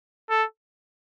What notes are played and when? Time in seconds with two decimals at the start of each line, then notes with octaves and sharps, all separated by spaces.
0.30 A4